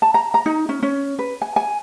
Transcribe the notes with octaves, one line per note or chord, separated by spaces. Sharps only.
A5
A#5
A#5
D#4
C#4
C#4
B4
G#5
G#5